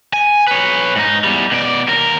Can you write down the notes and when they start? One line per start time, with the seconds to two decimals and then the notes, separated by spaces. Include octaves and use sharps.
0.13 G#5
0.47 B4 C#5
0.96 G#2 D#4
1.24 E2 G3
1.51 B2 D5
1.88 D#2 A#4